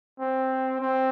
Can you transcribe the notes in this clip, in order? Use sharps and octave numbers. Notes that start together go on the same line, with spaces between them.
C4
C4